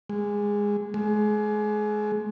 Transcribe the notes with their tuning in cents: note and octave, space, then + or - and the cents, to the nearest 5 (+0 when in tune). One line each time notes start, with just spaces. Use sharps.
G#3 -15
G#3 +25